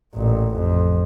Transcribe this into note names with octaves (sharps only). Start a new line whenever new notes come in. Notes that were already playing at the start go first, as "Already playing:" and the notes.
A1 A#2
F2